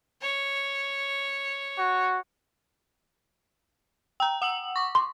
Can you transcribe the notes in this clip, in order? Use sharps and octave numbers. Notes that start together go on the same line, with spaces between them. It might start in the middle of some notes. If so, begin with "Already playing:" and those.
C#5
F#4
G5 A#5
F#5 E6 F#7
C#6 D6
C6